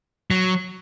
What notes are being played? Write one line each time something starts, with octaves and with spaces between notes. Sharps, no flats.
F#3